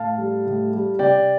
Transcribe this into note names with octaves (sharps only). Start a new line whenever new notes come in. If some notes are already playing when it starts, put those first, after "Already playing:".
Already playing: A2 F5 A5
G3
A2
G3
C3 D5 G5